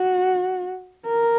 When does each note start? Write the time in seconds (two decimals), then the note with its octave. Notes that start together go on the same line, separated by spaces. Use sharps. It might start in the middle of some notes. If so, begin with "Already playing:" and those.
Already playing: F#4
1.07 A#4